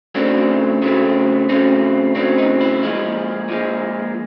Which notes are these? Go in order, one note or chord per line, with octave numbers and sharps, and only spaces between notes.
C#3 F#3 A3 C4 D4
C#3 F#3 A3 C4
C#3 F#3 A3 C4 C#4
C#3 F#3 A3 C4 D4
D#4
E4
A#2 F3 G#3
A#2 F3 G#3